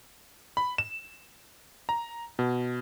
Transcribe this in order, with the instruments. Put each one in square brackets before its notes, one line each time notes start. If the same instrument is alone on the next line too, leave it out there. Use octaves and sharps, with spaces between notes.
[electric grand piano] B5
E7
A#5
B2